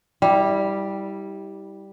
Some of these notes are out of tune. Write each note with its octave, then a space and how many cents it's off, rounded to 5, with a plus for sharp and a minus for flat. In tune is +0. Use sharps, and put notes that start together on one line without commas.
G3 +0 E4 -30